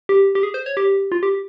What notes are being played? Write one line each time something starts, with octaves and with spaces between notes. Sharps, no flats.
G4
G4
G#4
C5
C#5
G4
F4
G4